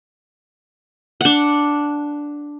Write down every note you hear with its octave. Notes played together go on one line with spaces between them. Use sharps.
D4 F#5